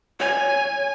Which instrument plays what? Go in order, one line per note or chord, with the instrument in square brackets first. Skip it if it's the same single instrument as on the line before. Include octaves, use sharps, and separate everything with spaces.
[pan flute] C#5 [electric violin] G#5